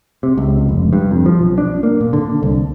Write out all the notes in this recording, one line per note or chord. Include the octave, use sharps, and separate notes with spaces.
C3
C#2
F1
G2
F2
F3
B1
D4
A#3
A#2
D3
C2